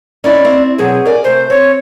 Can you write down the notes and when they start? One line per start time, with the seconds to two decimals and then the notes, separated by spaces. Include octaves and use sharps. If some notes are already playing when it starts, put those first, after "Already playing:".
0.24 C#4 D#4 E4 D5
0.45 C4 E4
0.78 B2 F#3 C4 G#4
1.05 A#4 D5 G#5
1.24 C3 A3 C5
1.50 C4 C#5